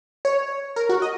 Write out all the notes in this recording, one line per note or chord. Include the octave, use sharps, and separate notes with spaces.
C#5
A#4
F#4
D#5